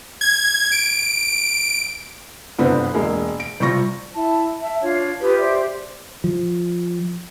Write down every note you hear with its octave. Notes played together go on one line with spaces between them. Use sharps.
G#6
D7
G1 C2 D3 B3 C4
E1 G#3 A#3
D7
C3 G3 F4 C#6 A#6
E4 A5
E5 A5
D4 F4 C#5
F4 G4 B4 D#6
C5 D5 E5
F3